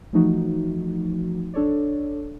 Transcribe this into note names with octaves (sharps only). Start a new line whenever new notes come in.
E3 F3 A3 D#4 F#4
D4 A4 C#5 D5